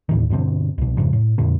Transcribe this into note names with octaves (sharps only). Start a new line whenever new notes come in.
D#2 A2 D#3
G2 B2 D3 C4
C2 B2
F2 G#2 C#3 F3
A2
F2 A#2 D3 A#3